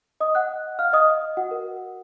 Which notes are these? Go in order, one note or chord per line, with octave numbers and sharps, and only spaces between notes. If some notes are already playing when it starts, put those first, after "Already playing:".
D#5 D#6
F#5 F#6
F5 F6
D#5 D#6
F#4 F#5
A#4